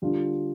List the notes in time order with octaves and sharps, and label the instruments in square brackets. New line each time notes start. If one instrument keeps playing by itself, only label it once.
[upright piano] D3 G3 D4 F4